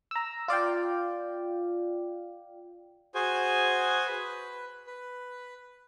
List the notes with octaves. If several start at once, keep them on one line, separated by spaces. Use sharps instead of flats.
A#5 E6
F4 D5 F5 G5
F#4 G#4 C5 G#5
B4
B4